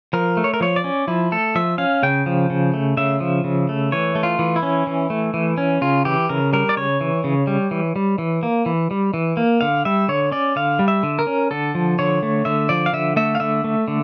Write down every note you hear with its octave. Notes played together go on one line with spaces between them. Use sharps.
F3 A#4
A3
C#5
A#4
F3 C#5
D5
C#4
F3 E4
A3 A4
F3 E5
C#4 F5
C#3 G5
F3
C#3
A3
C#3 E5
F3
C#3
A3
E3 C#5
A3
F4
E3
E4
C#4
E3
A3
E3
C#4
C#3 F4
E3 G4
C#3 A#4
G3 A#4
D5
C#3 C#5
E3
C#3
G3
E3
G3
E3
A#3
E3
G3
E3
A#3
D3 F5
G3 E5
D3 C#5
C#4 D5
D3 F5
G3
E5
D3
A#4
C#4
D3 A4
F3
D3 C#5
A3
D3 E5
F3 D5
F5
D3 E5
A3 E5
F5
D3 E5
A3
D3